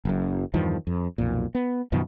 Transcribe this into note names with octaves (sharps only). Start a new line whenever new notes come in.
F#1 F#2
E2 G2 D#3 F3
F2
B1 F2 A#2
B3
F#2 B2 D#3 F3